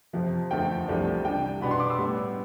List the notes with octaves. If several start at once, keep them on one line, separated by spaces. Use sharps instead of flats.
F2 C3 F3
E2 D3 F3 A3 G5
C2 C3 F3 A3 D4
C3 G3 D4 G5
B2 B3 D4 B5
C6
D6
E6
A2 G3 B3 D4